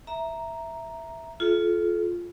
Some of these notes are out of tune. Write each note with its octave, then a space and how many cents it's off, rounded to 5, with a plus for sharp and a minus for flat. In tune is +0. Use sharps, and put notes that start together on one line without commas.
E5 +0 A#5 +0
F4 +0 A4 -40